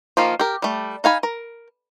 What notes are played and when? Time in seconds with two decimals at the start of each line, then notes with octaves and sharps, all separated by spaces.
0.17 D#3 F3 A#3 F4
0.39 G4 A#4
0.62 G3 A3
1.04 D#4 F5 G#5 B5
1.23 A#4